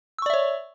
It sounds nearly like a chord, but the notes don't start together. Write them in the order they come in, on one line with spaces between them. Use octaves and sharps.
E6 C#6 D5 E5 C#5